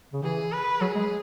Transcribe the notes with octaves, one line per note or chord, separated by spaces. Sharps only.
C#3
E3 G#4
B4
F#3 G#4
G#3